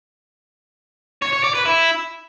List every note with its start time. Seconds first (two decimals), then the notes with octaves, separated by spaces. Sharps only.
1.22 C#5
1.33 C#5
1.44 D5
1.54 B4
1.65 E4